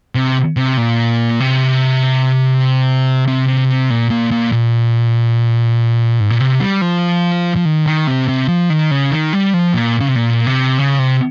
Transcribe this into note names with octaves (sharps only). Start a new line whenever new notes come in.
C3
C3
A#2
C3
C3
A#2
A#2
A#2
A#2
G#2
A#2
C3
G3
F3
F3
D#3
D#3
C3
C3
F3
D#3
C#3
D#3
G3
F3
A#2
C#3
C3
A#2
C3
C#3
C3